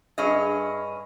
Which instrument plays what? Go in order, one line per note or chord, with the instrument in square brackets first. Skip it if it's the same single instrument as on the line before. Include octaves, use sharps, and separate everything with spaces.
[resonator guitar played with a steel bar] G2 C#4 G#4 D#5